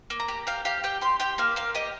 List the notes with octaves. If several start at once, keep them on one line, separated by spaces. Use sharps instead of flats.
A#3
A#5
G4
G4 F5
G4 F5
G4 G5
G4 C6
G4 G5
A#3 F5
A#3 F5
G4 D#5